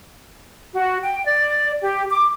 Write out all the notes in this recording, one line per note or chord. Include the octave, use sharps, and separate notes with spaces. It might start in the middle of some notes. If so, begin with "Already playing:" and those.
F#4
G5
D5
G4
D6